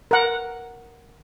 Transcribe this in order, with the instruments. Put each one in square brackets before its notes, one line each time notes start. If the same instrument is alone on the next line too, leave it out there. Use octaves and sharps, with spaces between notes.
[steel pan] A#4 F#5